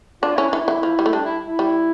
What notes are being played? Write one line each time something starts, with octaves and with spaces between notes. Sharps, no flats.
D4 F4
C#4 E4
D4
E3
E4
E3
F3
G3
A3
G3 D4
E4
E4
G3